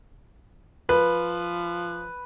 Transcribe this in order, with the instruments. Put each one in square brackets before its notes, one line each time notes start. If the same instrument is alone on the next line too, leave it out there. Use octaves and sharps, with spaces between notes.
[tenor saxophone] F3 [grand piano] B4